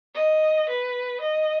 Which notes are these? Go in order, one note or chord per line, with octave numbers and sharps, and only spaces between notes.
D#5
B4
D#5